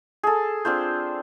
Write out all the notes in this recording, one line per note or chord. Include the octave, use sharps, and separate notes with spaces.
G#4 A4
C4 D4 F4 C5